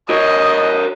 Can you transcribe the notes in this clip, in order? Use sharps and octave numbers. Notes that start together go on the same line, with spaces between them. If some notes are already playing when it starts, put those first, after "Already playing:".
A#4 C#5 D#5